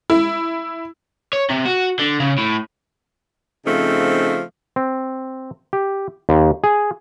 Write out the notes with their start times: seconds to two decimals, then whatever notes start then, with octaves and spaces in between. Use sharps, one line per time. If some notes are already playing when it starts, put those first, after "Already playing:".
0.10 E4
1.33 C#5
1.50 C3
1.66 F#4
1.99 D3
2.20 C#3
2.38 A2
3.65 C#3 F3 A3 C4 D#4
4.76 C4
5.73 G4
6.29 D#2
6.64 G#4